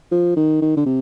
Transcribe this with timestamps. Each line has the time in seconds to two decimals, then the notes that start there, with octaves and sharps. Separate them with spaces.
0.11 F3
0.36 D#3
0.62 D#3
0.77 D3
0.86 C3